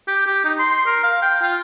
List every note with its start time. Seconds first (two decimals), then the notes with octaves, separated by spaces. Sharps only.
0.07 G4
0.26 G4
0.44 D#4
0.59 C6
0.86 A#4
1.03 F5
1.22 G5
1.42 F4